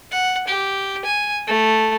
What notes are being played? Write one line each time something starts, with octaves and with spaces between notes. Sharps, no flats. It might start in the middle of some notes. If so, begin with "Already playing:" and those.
F#5
G4
G#5
A3